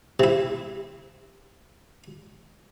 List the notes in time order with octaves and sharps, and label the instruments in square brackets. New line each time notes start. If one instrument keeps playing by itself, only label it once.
[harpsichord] C3 E4